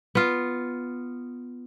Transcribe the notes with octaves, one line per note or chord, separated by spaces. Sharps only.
B3 F4